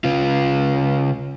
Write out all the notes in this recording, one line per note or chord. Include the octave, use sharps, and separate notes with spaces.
C#3 F4